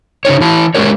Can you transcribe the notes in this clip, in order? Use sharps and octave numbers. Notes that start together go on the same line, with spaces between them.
C#3 C#4 D#4 C#5
E3 E4 A5
G#3 C#4 G4 A#4 C#5